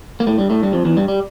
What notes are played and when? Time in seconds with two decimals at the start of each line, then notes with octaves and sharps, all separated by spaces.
0.20 A#3
0.27 A2 A3
0.38 G2 G3
0.50 A2 A3
0.62 G2 G3
0.73 F2 F3
0.85 E2 E3
0.97 G2 G3
1.08 G3